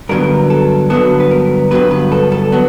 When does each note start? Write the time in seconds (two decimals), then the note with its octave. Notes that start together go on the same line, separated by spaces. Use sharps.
0.09 G2 D3 F#3 B3 A#4
0.50 A4
0.90 G2 D3 F#3 B3 A4
1.20 B4
1.31 A#4
1.71 G2 D3 F#3 B3 B4
1.91 B4
2.12 A4
2.32 A4
2.52 F#3 B3